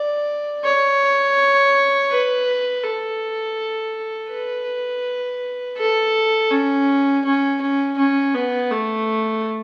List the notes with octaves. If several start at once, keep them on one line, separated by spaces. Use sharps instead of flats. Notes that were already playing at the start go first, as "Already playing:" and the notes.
Already playing: D5
C#5
B4
A4
B4
A4
C#4
C#4
C#4
C#4
B3
A3